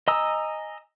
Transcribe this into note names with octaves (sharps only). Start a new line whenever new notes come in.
D#5 G#5 A#5 D#6 E6